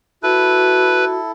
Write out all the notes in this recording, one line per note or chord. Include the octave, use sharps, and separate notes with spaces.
E4 F#4 A4 B4